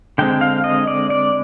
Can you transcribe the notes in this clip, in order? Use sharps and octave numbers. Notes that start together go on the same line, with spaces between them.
D3 G#3 C4 G5
F5
D#5
D5
D5